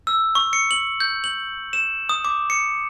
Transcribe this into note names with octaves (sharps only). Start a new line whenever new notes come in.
E6
C#6
C#7
F#7
G6
F#7
E7
D#6
D6
C#7